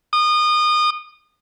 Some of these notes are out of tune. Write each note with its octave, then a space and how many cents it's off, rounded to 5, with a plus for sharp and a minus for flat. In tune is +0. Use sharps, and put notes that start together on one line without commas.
D#6 -30